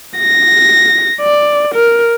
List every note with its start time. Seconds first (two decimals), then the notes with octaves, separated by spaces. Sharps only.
0.18 A#6
1.22 D5
1.75 A#4